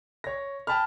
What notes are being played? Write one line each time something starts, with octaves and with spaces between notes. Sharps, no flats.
C#5 A#6
G5 A5 B5 F6